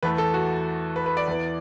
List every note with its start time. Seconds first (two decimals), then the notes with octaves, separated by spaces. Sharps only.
0.03 E2 E3 A3 B4
0.18 A4
0.34 F#4
0.96 B4
1.06 B4
1.17 D5
1.28 E2 E3 B3